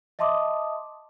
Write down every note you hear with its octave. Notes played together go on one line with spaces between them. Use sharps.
D#5 E5 A5 C6 D6 D#6